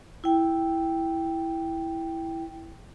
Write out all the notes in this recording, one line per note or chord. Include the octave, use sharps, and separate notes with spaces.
E4 G5